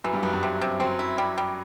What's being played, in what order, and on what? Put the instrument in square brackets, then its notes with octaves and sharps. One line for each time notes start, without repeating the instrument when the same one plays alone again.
[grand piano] F#2 F#3 [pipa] E3
[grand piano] G2 G3
[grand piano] F#2 F#3 [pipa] B3
[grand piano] G2 G3
[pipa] C3
C3
[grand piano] F#2 F#3 [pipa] C4
[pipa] E4
G3
G3